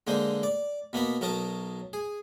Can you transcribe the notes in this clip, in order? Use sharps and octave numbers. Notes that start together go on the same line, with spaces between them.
D3 G#3 A#3 C5
D5
B2 A#3 B3 B5
B1 F#3 A#4 A5 D#6
G#4